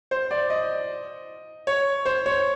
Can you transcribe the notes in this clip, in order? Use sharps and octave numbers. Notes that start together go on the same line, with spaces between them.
C5
D5
D#5
C#5
C5
C#5